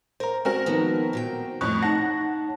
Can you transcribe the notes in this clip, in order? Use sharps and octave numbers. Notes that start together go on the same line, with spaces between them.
A#4 C5 F5 A#5
G#3 C4 F#4 A#4
D#3 F3 B3
A#2 F#3 G5
F2 A2 C#5 C#6 F#6
D#4 F#5 A5 A#6